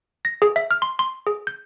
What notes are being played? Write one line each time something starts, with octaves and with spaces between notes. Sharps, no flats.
A#6
G#4
E5
F6
C6
C6
G#4
G6